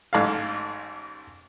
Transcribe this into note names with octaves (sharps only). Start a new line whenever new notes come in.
A1 G#2 A3 A4 F5